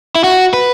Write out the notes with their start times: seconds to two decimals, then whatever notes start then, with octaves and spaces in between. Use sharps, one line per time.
0.15 E4
0.24 F#4
0.54 B4